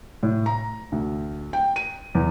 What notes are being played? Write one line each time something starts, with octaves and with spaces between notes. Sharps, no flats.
A2
A#5
D2
G5
D#7
E2